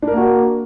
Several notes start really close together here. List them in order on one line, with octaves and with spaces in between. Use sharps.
D4 A#4 A#3 F#4